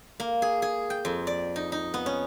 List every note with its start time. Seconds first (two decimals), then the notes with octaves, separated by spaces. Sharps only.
0.20 A#3
0.42 G#4
0.62 G#4
0.90 G5
1.05 F2
1.27 D5
1.56 D#4
1.72 D#4
1.94 B3
2.06 C#4